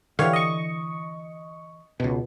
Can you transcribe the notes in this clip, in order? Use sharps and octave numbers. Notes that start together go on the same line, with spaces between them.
D3 E3 G4 C#5 F5
D#5 C#6
C#2 B2